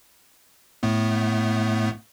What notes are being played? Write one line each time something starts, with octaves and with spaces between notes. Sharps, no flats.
A2 A3 B3